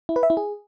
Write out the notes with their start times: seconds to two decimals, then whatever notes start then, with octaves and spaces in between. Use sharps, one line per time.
0.09 E4
0.16 B4
0.23 E5
0.30 E4
0.37 G#4